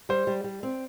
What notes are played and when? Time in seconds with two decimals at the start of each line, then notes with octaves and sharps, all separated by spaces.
0.09 G3 C5
0.27 G3
0.44 G3
0.63 C4